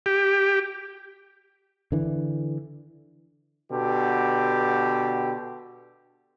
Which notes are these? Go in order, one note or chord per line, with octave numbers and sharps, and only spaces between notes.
G4
D3 E3
B2 D3 G4